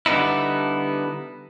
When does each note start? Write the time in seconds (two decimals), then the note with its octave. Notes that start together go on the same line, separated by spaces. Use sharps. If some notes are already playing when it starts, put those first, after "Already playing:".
0.06 D3 G3 B3 D#4 E4